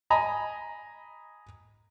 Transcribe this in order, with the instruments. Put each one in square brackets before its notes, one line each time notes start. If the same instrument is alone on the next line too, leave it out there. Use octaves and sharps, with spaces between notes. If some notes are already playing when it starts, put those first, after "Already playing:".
[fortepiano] D#5 G#5 A#5 B5